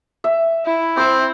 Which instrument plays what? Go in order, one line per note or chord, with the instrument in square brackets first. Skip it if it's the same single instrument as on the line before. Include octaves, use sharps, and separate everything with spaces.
[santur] E5
[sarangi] E4
[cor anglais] C4 [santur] C5 D6